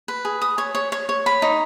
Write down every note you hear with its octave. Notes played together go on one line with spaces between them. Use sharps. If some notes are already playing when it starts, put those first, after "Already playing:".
B4
G#4
D#6
C#5
C#5
C#5
C#5
B5
D#4